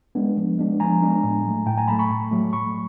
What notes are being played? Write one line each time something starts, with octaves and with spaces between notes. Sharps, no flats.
G#3 B3 D4
F3
G#3 B3 D4
F3 G#5 A#5
G#3 B3 D4
A2
F#3 A3
A2 G5 A5
G#5 A#5
F#3 A3 A5 B5
B5 C#6
A2
F#3 A3
A2 B5 C#6